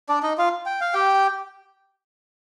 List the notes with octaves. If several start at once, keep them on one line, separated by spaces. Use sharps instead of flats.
D4 D5
D#4 D#5
F4 F5
G5
F5
G4 G5